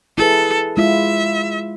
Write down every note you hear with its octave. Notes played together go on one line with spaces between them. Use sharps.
E4 G#4 A4 B4
G#3 E4 F4 E5